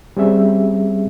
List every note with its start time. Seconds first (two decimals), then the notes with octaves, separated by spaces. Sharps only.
0.17 G3 C4 C#4 G#4 E5